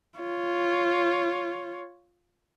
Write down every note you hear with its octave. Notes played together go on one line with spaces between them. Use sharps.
F4 C#5